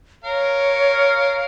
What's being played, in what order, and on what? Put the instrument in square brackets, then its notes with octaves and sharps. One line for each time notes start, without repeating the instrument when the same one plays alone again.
[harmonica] A#4 F5 [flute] C#5